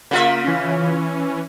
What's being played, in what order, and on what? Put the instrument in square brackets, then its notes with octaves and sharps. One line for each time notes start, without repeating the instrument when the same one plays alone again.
[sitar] C#3 F4 E5 [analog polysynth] A#3
[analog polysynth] E3 C#4